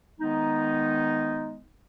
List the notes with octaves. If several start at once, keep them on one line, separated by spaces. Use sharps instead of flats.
D#3 G#3 B3 D#4